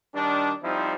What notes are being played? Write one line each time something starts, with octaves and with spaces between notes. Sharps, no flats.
D#3 G3 D4
F3 G3 C4 D#4 E4